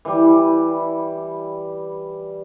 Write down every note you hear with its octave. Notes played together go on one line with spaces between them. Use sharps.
E3 G3